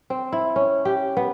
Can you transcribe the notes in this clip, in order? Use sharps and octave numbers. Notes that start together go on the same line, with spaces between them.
C4
E4
C#4
G4
B3